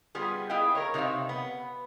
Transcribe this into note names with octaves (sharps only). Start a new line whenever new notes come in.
G3 B3 F4 G#4
B3 E4 G#4 D#5 F5 G5
A#4 C#5
C3 D#4 C#5 E5 F5
B3